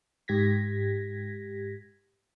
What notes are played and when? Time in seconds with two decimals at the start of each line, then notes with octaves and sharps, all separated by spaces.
0.28 G#2 G4 G#6 A#6 B6